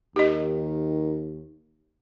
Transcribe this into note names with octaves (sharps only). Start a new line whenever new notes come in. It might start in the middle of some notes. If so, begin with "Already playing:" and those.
D#2 D#3 G4 D#5